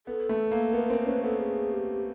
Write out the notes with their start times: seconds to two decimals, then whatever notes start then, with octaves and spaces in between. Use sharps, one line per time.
0.07 B3 A4
0.29 A3
0.52 A#3
0.73 B3 A#4
0.90 C4 A#4
1.06 C#4 B4
1.23 B3 A4
1.39 G#4
1.74 G4